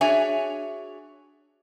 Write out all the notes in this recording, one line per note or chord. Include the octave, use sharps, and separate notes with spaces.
D4 F#4 G#4 C#5 E5 G#5